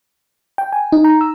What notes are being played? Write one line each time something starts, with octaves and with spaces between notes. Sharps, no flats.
G5
G#5
D#4
A#5
E6